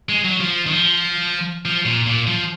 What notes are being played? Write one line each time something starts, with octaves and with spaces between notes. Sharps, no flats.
G#3
F#3
F3
D#3
F3
F3
A#2
A#2
F3